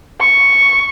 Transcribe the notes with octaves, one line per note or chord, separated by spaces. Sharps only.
C#6